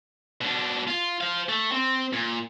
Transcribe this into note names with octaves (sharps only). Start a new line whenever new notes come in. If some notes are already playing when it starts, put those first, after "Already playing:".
B2 D4
F4
C5 F5
A3
C4
A#2